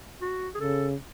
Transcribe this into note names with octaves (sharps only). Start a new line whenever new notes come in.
F#4
G#4
C#3 A4